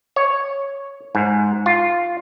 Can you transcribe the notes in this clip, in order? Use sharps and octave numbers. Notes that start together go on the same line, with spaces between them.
C#5
G#2
F4